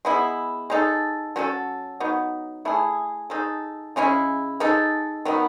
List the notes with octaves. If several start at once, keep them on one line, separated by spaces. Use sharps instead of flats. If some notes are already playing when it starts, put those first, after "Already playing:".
G#3 B3 E4
G#3 D#4 A4
F#3 C#4 F#4 A4
F#3 B3 D#4
A3 E4 G#4
G#3 D#4 A4
C#3 G#3 C#4 E4
G#3 D#4 A4
D#3 F#3 B3